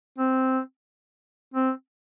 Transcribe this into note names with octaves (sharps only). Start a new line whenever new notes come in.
C4
C4